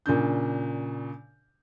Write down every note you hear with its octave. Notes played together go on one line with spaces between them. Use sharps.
A#2 C#3 D4 G6